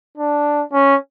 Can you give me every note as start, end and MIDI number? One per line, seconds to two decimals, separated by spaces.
0.17 0.64 62
0.73 0.96 61